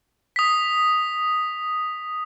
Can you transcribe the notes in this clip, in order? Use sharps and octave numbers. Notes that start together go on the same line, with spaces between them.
D#6 B6